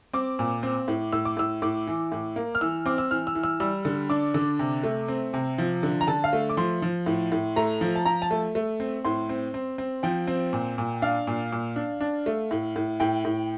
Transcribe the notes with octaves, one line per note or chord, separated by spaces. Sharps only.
C4 D6
A#2
C4
A2
A2 E6
D6
A2 E6
A2 D6
E3
A2
A#3
F6
E3 E6
C4 D6
E6
E3 F6
E6
E3
E6
G3 E6
D3
D4 D6
D3
C3
A3
C4
C3
F3
D3
A#5
D3 A5
F5
A3
D6
F3 C6
F3
A2
A2
A3 A#5
F3
A5
F3 A#5
A5
A3
A3
C4
A2 C6
C4
C4
C4
F3 G5
C4
A#2
A#2
D4 F5
A#2
A#2
D4
D4
A3
A2
A2
A2 G5
A2